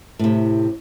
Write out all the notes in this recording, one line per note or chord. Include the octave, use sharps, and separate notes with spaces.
A2 C3